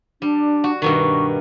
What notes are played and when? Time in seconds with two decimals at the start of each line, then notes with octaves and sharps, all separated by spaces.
0.22 G3 D4
0.64 F#4
0.82 G2 B2 D#3 C#6